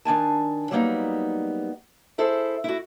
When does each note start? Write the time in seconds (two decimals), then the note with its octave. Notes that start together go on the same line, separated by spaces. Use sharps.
0.05 D#3 D4 G#5 A5
0.71 F#3 G3 A#3 B3 C#4 D#4
2.18 E4 G#4 A4 C5
2.64 E4 F#4